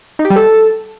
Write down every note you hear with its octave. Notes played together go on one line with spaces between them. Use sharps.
D#4
G4
G3
A4